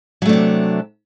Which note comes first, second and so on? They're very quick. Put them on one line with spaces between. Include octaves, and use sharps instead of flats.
F#3 A3 D4 C3